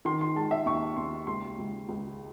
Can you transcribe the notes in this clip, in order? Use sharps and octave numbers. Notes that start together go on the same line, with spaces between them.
D#3 C6
C6
G#3 A5
E5
D#2 C#6
D#2 C6
C#2 C6
C#2
C#2